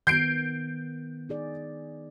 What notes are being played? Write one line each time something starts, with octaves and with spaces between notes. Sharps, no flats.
D#3 B3 G6 C7 D7
D#4 G#4 D5